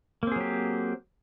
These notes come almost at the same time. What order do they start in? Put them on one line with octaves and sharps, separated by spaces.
A#3 C4 G#4 F#3 G4